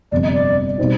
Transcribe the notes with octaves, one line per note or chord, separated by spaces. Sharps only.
G1 F2 C3 D5
D#5
D5
B2 G3 C4 D#4 G4